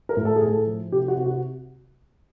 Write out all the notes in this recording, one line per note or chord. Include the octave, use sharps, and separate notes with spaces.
A#4
A2
A4
G#4
A2
A4
F3
C3 G4
F#4
C3
F#4